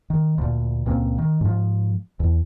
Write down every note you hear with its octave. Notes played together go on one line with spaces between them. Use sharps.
D#3
D2 A#2
C#2 A#2 A#3 C4
D#3
G#2 F3
E2